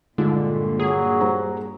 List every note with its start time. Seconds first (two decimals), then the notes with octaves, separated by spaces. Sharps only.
0.18 G2 A#2 D3 G#3 F4
0.80 F#3 G#4
1.21 G3 C5 A#5